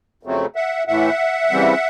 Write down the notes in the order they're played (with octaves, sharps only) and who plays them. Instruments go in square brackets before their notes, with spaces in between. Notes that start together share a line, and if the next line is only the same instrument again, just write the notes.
[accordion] F2 C#3 F#3 A3 C4
E5 F#5
A2 E3 A3 E5 F#5
C#3 E3 G3 C4